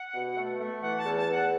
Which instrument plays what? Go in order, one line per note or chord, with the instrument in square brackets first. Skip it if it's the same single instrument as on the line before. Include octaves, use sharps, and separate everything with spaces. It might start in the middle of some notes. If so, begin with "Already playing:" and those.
Already playing: [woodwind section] F#5
B2
A3
A3
E3 F#5
A5
E2
A5
E2
F#5